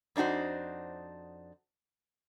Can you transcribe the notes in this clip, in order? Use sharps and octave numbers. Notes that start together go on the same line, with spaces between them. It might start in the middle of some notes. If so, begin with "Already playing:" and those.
F2 D4 D#4 F#4 C5